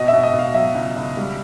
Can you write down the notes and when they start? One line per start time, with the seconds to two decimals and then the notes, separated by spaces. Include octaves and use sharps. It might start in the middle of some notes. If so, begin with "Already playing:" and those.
Already playing: B2 D#5
0.08 E5
0.13 B2
0.23 D#5
0.33 B2
0.39 F5
0.54 F#3 E5
0.75 C#2
0.97 C#2
1.17 G3